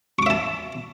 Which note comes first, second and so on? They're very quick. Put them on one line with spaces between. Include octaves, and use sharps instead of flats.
C#6 D6 E5 A5